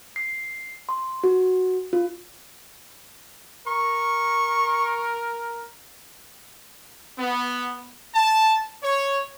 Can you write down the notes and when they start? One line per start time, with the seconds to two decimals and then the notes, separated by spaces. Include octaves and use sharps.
0.16 C7
0.89 C6
1.24 F#4
1.93 F4
3.67 A#4 C#6
7.19 B3
8.14 A5
8.83 C#5